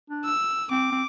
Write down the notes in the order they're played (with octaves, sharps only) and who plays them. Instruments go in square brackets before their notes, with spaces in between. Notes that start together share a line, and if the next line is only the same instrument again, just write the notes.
[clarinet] D4
[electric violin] E6
[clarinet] C4 [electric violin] D6
[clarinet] C4